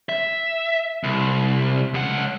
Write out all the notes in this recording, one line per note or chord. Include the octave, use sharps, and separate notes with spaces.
E5
C2
C#2 F#5